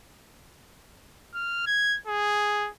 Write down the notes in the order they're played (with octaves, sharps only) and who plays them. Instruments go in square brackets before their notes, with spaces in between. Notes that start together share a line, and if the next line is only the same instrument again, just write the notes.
[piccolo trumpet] F6
G#6
G#4